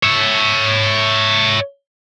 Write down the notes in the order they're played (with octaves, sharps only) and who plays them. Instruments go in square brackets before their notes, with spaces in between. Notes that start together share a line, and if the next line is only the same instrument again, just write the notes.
[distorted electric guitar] C#5 E5